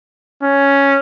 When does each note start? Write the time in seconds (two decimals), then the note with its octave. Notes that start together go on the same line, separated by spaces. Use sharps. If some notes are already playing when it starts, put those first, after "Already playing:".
0.43 C#4